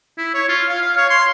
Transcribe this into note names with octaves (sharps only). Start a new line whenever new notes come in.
E4
C#5
F4
F5
F5
C#5
C6